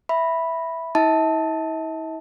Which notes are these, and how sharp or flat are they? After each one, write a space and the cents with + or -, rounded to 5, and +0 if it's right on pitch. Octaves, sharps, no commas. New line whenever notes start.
E5 +0 B5 -5
E4 -40 E5 -45 A5 +0